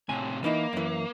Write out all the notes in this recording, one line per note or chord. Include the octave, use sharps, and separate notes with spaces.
A2 C3 G#5
E3 A#3 D#4 E4
F#2 E3